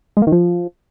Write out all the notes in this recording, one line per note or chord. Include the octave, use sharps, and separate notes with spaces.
G#3
A#3
D#3
F3